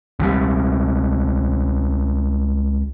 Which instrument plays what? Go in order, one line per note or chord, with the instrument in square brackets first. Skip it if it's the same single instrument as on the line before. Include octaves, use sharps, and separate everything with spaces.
[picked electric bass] C#2 G3